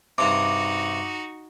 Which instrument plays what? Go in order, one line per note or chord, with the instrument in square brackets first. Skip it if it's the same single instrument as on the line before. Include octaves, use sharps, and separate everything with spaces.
[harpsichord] G2 C3 [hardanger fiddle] D#4 F#4 [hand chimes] D6